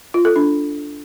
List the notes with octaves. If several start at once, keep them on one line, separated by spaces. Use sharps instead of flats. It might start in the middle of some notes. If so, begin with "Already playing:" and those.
F4
A4
D4